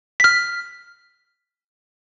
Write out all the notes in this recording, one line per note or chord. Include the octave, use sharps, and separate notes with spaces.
F6 B6